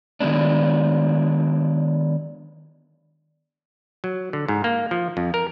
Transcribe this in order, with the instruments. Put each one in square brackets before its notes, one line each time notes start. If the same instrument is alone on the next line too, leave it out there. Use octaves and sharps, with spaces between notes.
[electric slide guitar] D#3 F#3 G#3 B3 D4
[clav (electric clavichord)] F#3
D3
G#2
A#3
F3
F2
A#4